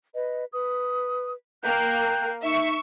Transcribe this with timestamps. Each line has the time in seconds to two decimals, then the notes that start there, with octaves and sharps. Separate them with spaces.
0.15 B4 D#5
0.53 B4 D#6
1.64 A#3 G5 F#6 G6
2.43 D#4 E5 C#6